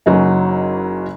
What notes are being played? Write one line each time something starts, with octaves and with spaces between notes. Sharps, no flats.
F#1 F#3 C#4 D#4